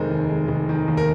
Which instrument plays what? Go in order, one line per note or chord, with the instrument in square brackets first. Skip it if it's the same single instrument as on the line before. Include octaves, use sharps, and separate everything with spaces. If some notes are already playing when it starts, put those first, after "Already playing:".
Already playing: [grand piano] F1 D#3 G#3 A#4 C5
D#2
G#3
F1
D#3
D#2
A#4